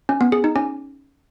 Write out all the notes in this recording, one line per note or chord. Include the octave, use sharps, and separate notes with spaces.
C#4
B3
G#4
D#4
C#4